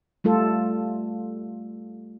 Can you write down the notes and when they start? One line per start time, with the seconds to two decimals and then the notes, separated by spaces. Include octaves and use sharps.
0.24 G3 A3 F4 A4